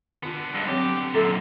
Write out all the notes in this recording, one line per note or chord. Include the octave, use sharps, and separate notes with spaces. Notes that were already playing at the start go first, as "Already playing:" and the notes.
D3 D#3 B3 F4
G2 G#3
F#3 C4 G4 C#5
F#2 A#2 F#3 A4 E5 A#5